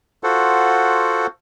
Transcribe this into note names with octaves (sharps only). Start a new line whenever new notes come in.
F4 F#4 A4 C5 F#5